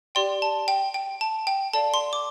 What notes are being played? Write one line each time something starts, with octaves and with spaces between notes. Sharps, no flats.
G4 D5 G5 C6
A5
G5
G5
A5
G5
A4 D5 F5 A5
C6
D6